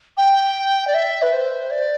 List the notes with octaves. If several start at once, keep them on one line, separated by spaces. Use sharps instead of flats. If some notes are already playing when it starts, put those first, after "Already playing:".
G5
D5
E5
B4
C5
D5